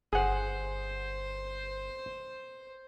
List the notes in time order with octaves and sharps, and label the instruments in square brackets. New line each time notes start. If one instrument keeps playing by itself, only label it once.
[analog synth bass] G1 [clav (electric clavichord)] G#4 F#5 [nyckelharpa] C5